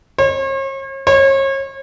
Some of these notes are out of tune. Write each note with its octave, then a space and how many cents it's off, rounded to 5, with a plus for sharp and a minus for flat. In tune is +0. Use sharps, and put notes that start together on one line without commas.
C#5 -45
C#5 -35